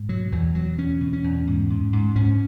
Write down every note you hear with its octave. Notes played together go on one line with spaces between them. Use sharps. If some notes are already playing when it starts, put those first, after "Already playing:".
Already playing: G#2
B2 F#3
E2 E3
B2 F#3
E2 C#4
B2
C#4
E2
G#2
G#2
G#2
G#2 C#4